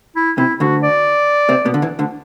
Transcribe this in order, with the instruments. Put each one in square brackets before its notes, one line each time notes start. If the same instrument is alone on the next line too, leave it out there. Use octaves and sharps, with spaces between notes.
[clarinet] E4
[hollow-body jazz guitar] C3 [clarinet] E4
[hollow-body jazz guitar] D2 D3 [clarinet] F#4
[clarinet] D5
[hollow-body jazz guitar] C3 C4
B2 B3
D3
E2 E3
D2 D3